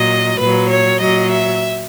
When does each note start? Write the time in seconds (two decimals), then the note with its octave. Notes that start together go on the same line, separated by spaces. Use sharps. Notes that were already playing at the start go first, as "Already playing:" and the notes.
Already playing: A#2 F#3 D#5
0.39 A#2 F#3 B4
0.70 C#5
1.00 A#2 F#3 D#5
1.30 E5